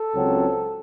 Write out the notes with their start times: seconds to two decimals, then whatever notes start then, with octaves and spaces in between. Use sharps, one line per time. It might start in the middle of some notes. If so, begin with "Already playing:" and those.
Already playing: A4
0.14 C#2 C#3 F#3 C4